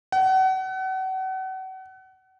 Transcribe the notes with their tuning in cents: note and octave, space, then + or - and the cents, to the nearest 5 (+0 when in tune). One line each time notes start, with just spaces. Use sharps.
F#5 +35